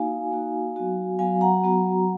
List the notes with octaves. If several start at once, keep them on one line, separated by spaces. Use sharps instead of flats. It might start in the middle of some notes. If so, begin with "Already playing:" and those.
Already playing: A#3 D#4 F#4 F5 G#5
A#3 D#4 F#4
F#3 B3 F#4
F#3 B3 F#4 F5 G#5
F#5 A#5
F#3 B3 F#4